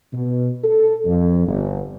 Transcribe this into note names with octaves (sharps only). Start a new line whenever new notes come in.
B2
A4
F2
G1